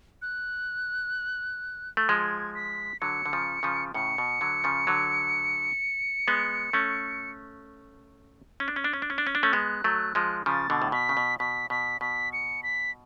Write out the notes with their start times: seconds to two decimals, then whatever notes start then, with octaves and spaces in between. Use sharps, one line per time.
0.22 F#6
1.97 A3
2.09 F3 G#3 G#6
2.55 B6
3.01 D3 F#3 C#7
3.26 D3
3.33 C#3 F3
3.63 C#3 F3
3.94 A2 C#3 C#7
4.18 B2
4.41 D3 F#3
4.64 C#3 F3
4.87 D3 F#3
6.28 G#3 B3
6.73 A3 C#4
8.60 C#4
8.68 D4
8.76 C#4
8.84 D4
8.93 C#4
9.02 D4
9.10 C#4
9.18 D4
9.27 C#4
9.35 D4
9.43 A3 C#4 F6
9.53 G#3 B3 F#6
9.84 F#3 A3
10.15 F3 G#3
10.46 C#3 F3 A6
10.70 B2 D3
10.82 A2
10.92 B2 B6
11.09 C#3
11.17 B2
11.39 B2 B6
11.70 B2 B6
12.01 B2 B6
12.33 C#7
12.63 B6